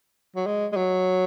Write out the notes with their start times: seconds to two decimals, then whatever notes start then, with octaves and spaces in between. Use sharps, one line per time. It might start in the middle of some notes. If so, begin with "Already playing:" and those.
0.36 F#3
0.46 G#3
0.72 G#3
0.76 F#3